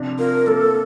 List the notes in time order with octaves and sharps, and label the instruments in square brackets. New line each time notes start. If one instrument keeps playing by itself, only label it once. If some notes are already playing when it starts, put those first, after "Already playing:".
Already playing: [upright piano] C3 F3 D4
[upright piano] F4 [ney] A#4
[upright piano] A#3 [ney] A4